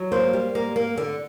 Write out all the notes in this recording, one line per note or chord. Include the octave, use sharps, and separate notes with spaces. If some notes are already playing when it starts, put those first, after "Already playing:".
Already playing: F#3
A#3 C5
G3
A#3
A#3
D3